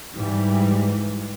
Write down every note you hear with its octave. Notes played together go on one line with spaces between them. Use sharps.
G#2 E3 G3